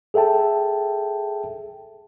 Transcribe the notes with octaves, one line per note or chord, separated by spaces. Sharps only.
G#4 A4 E5 G5 A5